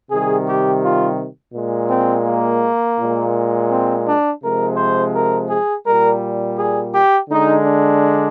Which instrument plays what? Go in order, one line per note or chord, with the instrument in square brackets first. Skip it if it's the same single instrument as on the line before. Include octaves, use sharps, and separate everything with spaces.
[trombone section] C3 D#3 G3 G#4
G4
F4
A#2 G#3
C4
A#3
A#2 G#3
C4
D4
C3 F3 G#3 A#4
C5
A#4
G#4
A#2 G3 A#4
G#4
G4
D3 G#3 D#4
D4